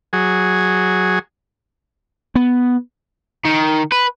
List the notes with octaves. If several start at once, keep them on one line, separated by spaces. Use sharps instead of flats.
F#3 G#4
B3
D#3
B4